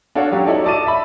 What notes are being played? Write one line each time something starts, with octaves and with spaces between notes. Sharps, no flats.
D4 F#4 A4 C#5 F5
F#3 C#4 G4
D#4 E4 A4 C#5 D5
D5 D#5 A5 D6 A6 D#7
E5 B5